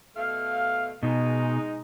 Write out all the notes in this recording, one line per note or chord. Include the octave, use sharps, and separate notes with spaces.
B2 A3 F5
B2 G#3 D#4